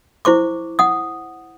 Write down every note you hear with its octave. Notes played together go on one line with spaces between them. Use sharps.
E4 C5 C#6 D6
F#5 D#6